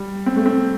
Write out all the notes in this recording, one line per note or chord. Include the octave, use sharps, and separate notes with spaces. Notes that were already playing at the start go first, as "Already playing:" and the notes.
Already playing: G3
C4
A3
C4